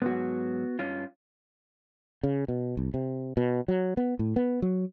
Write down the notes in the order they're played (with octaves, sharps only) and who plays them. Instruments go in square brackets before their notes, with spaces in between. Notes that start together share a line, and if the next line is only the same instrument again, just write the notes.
[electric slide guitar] G#2 F#3 [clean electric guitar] B3 F#4
[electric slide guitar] G2 C#4 F4
[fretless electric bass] C#3
B2
C2
C3
B2
F#3
B3
A2
B3
F#3